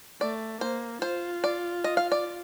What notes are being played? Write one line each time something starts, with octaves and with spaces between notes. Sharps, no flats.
A3 D5
A#3 C5
F4 C5
D5
D#5
F5
D5